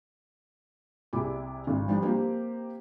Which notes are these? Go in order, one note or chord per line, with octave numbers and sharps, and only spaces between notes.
C2 C3 E4 G#4 D6
G#1
F3 G3 D4
A#3 C4 F4 G4